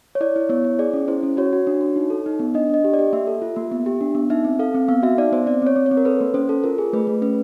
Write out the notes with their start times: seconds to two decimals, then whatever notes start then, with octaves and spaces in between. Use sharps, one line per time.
0.15 C#5
0.21 E4 D5
0.36 E4
0.49 B3 C#5
0.64 E4
0.79 G#4 D5
0.93 C#4
1.08 E4 C5
1.23 C#4
1.37 F#4 C#5
1.53 F#4
1.67 D4
1.81 F#4
1.96 D#4
2.10 A4
2.26 D#4
2.39 B3
2.54 D4 D#5
2.69 D4 D#5
2.84 G4
2.94 D5
2.99 G4
3.13 A#3 E5
3.27 A4
3.42 F4
3.56 A#3
3.72 B3
3.86 G4
4.01 D4
4.15 B3
4.30 D#4 E5
4.45 C4
4.59 A4 F5
4.74 C4
4.88 B3 F5
5.03 F#4 E5
5.18 D#4 D5
5.32 B3 C5
5.46 C4 D5
5.62 C4 C#5
5.76 C4
5.86 C#5
5.91 C4
5.97 A#4
6.05 A4 B4
6.21 A#3
6.34 C#4 C5
6.49 A4
6.64 F4 A#4
6.78 G#4
6.93 A3 B4
7.07 A3
7.22 C#4 B4